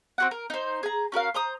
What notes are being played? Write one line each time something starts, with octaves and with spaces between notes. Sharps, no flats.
C4 F#4 F#5
A#4
D#4 C5
G#4 A#5
C#4 F#4 A#4 F5
C5 A#5 D#6